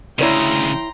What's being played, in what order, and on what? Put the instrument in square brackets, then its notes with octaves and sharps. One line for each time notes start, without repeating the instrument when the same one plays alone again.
[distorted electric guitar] D2 C#3 [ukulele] E4 C#5 D5 [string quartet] G5 A#5 C6